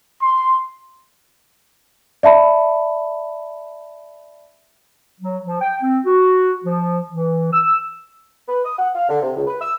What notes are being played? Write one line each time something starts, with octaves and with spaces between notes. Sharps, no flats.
C6
D5 E5 A5 B5
F#3
F3
G5
C4
F#4
F3
E3
E6
B4
D#6
F#5
F5
D3
C3
C#2
B4
E6